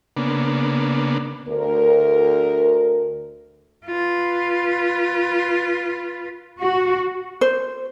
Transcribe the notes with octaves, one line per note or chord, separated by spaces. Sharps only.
C#3 A#3 B3 D4
D2 A#4
F4 B4
F#4
C5